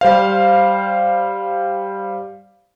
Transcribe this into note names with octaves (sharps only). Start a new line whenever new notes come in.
G3 C5 F5